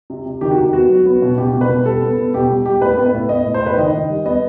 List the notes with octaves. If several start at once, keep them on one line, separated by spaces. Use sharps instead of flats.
C3
C3
D#3 G4
F#4
D#3
B3 F#4
F#3
B3
B2
B2 G4
B2
B4
B2
G3 A4
B3
B3
B2 G4
G3
G3 G4
A2 B4
B3
B4
A2
B3 D#5
A2
C5
A2
B4
D#3 D#5
D#3
G3
B3 D#5